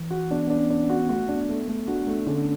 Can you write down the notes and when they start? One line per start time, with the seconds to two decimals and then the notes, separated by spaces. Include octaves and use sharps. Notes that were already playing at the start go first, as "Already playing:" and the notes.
Already playing: E3
0.11 F#4
0.31 B3 D4
0.47 B3 D4
0.57 C#4
0.70 D4
0.83 B3
0.90 F#4
1.09 A3 F#4
1.28 D4
1.35 B3
1.49 A3
1.68 A3
1.88 D4 F#4
2.07 A3 D4
2.27 D3 C#4